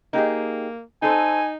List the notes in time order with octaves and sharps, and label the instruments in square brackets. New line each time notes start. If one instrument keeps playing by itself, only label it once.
[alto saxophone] A#3 [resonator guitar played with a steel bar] D#4 G4 G#4
[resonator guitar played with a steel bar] C4 A4 C5 [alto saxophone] D#4 [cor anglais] G#5